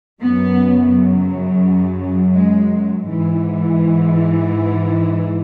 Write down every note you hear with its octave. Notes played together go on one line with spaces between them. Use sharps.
F#2 C#3 F#3 B3
G#3
G#2 E3